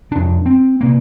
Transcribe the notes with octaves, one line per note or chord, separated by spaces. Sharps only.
F2 C3 D4
C4
C3 A#3